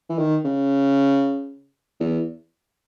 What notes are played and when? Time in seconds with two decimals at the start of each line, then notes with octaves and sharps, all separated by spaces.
0.10 E3
0.18 D#3
0.44 C#3
2.00 E2